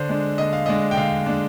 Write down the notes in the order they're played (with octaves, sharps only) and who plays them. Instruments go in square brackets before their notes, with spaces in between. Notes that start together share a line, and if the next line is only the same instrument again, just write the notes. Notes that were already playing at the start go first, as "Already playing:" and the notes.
Already playing: [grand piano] D3 C5
G#3 D4
D3 D#5
F5
G#3 D4 D#5
G5
D3 F5
G#3 D4